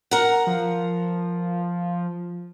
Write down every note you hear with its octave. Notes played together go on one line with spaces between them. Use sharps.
A#4 F#5
F3